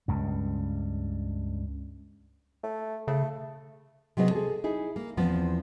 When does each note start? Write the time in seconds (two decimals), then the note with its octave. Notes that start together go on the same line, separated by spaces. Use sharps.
0.08 C#2 G2
2.63 A3
3.08 C#3 A3
4.17 C3 F#3 B3 G#4 D#5
4.31 G#4 A4
4.64 D#4 E4 G#4
4.96 A#3
5.17 E2 F3 B3 C4